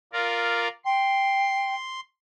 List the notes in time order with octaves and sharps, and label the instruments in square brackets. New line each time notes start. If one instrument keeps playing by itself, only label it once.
[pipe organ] F4 A#4 D5
[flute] G5 [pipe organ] C6